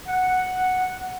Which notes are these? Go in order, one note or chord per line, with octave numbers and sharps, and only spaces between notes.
F#5